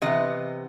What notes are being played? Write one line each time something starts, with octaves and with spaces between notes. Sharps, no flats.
C3 E3 B3 D#5